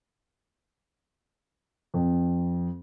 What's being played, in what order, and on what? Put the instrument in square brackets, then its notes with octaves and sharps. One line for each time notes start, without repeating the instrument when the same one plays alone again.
[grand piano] F2